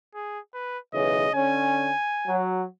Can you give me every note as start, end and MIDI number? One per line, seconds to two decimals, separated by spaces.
0.15 0.39 68
0.54 0.78 71
0.94 1.27 35
0.94 1.27 49
0.94 1.27 52
0.94 1.31 75
1.34 1.90 50
1.34 1.90 61
1.34 2.37 80
2.28 2.64 54